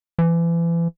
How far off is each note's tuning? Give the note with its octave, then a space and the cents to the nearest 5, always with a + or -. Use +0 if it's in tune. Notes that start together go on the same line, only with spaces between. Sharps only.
E3 +35